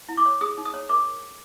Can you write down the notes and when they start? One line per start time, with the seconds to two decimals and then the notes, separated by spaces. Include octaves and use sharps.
0.09 E4
0.17 D6
0.26 C#5
0.41 G#4 D#6
0.57 D#4
0.65 D#6
0.74 C#5
0.89 A#4 D6